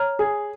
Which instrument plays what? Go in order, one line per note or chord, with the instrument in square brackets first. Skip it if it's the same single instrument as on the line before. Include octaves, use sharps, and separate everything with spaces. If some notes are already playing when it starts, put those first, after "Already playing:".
Already playing: [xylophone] C#5 A#5 F6
[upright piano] G#4